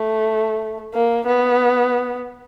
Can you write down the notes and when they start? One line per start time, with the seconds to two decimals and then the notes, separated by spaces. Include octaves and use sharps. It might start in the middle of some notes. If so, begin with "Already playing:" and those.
Already playing: A3
0.93 A#3
1.27 B3